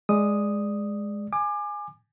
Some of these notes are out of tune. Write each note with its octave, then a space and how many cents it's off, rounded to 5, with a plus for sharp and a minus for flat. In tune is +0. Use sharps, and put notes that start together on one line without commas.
G#3 +0 D5 +10 D#6 +0
G#5 +0 D6 +30